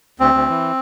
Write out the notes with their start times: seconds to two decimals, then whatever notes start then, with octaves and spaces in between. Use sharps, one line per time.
0.20 D2 C4
0.34 D2
0.48 E3